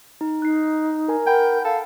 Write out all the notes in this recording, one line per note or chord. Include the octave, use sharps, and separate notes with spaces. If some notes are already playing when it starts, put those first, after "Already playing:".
D#4
D#4 F#6 C7
A#4 G#5 A#5
A#4 F#5 G5 B5
A4 F5